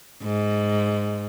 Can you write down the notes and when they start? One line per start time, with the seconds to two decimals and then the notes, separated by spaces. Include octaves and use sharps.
0.23 G#2